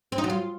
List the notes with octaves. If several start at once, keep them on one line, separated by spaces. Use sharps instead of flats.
C4
D#4
F#3
F4